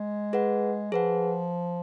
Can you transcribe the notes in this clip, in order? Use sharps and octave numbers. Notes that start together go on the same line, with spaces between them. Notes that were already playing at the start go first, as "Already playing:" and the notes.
Already playing: G#3
G#4 B4 F#5
F3 G#4 B4 F#5